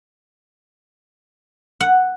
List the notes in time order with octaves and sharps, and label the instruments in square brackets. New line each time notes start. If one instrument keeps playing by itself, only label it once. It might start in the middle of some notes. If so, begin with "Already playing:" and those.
[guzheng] F#5